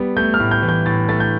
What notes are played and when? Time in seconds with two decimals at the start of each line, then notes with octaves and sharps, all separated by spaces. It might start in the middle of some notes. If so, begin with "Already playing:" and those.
Already playing: G3 B3
0.17 A3 G6
0.34 F6
0.40 A2
0.51 G6
0.62 E3
0.69 G6
0.86 A2 A6
1.09 A3 A6
1.20 G6